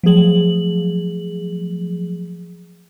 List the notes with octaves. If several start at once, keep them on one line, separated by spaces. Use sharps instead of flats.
F3 F#3 A3 G#4 F#7